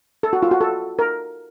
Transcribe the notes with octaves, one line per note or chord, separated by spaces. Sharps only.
A4
F#4
F4
F#4
A4
A#4